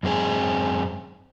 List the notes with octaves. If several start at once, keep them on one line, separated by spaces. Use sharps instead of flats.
F#2 G#3 C4 G#4